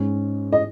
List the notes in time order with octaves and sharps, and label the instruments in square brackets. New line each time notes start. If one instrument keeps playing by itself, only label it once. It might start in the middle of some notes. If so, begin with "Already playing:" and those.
Already playing: [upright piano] G#2 G#3 C#4
D#5